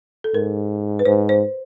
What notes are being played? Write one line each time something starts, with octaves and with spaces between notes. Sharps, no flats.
A4
G#2 A#4
B4
G#2 C5
C5